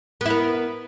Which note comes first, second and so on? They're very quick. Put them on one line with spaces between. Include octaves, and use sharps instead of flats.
B3 E4 A#4